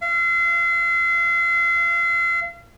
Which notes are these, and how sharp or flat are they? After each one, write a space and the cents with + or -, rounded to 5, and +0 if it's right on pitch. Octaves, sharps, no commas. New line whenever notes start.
F5 -35